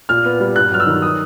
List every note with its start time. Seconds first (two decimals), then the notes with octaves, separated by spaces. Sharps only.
0.09 A#2 F6
0.25 B3
0.40 G3
0.56 G2 F#6
0.72 F#3 F6
0.80 E6
0.87 D#3
1.02 D#6